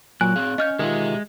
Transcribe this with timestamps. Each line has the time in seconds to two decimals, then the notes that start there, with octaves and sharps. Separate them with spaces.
0.21 A#2 F#3 G#5 F#6
0.36 C4 G#4 F5
0.58 C#4 D#5 F6 G6
0.79 D#3 G#3 F4 G4 E5